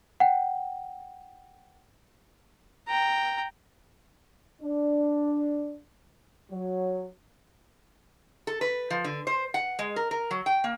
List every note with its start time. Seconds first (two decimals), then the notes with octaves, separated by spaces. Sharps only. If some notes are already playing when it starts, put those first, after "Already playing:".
0.20 F#5 G5
2.87 G5 A#5
4.62 D4
6.52 F#3
8.47 A4
8.61 B4
8.90 F3
9.04 D3
9.27 C5
9.54 F#5
9.79 G#3
9.96 A#4
10.11 A#4
10.31 F#3
10.46 G5
10.64 A#3